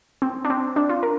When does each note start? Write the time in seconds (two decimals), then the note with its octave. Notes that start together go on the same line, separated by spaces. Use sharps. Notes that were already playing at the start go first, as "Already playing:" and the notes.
0.22 C4
0.45 D4
0.50 C4
0.76 D4
0.89 F4
1.03 A#4